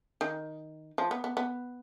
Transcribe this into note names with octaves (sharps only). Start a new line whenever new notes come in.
D#3
F3
B3
B3
B3